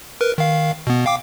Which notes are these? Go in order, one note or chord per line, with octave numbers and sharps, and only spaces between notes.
A#4 B4
D#3 F5
B2 B3
F5 G5 D6